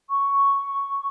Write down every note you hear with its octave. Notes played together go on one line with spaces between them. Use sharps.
C#6